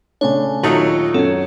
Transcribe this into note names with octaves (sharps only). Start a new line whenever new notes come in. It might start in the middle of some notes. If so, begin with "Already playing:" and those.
C#3 A3 D4 C#5 G#5
D#2 A#2 F#3 A3 D#4 F#4
F#2 C#4 A4